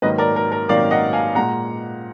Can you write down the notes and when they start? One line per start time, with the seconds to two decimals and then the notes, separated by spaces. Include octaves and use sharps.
0.02 G#2 D#3 F#3 A#3 B4 D#5
0.18 A#4 D5
0.36 A#4
0.52 A#4
0.68 G#2 D#3 F#3 A#3 D5 F5
0.91 D#5 F#5
1.13 F5 G#5
1.35 A#2 G#3 F#5 A#5